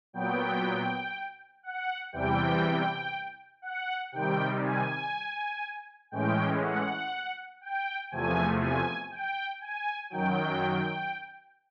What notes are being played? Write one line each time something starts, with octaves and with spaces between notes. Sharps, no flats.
A#2 F#3 B3 G5
F#5
E2 C3 E3 G3 G5
F#5
C3 D#3 G3 G5
G#5
A2 E3 G#3 C#4 G5
F#5
G5
E2 C3 F3 A3 G#5
G#5
G5
G#5
F#2 D#3 F#3 G5